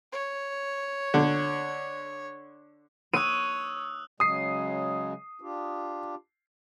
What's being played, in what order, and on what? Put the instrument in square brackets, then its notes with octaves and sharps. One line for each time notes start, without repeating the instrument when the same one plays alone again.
[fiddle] C#5
[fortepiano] D3
[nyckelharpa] C#5 C#6 [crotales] D#6 E6 F#6 [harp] D#7
[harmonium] C#3 F#3 G#3 [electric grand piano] D#6 C7
[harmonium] D4 F4 G4